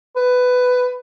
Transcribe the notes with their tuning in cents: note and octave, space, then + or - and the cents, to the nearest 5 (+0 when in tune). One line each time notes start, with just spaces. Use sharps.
B4 +15